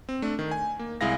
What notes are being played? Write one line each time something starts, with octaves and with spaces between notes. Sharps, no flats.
C4
A3 D4
D#3
G#5
A#3
C2 G#3 E4 G#4 F5 A#6